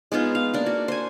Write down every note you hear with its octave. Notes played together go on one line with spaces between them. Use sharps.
G#3 B3 D#4 F4
F5
A#3 D4
F#4
C5 G#5